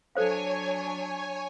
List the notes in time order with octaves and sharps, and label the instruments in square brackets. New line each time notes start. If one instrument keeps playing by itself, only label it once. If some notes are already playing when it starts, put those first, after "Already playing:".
[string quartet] F#3 D4 [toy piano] A4 C5 F5 [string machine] C#5 G#5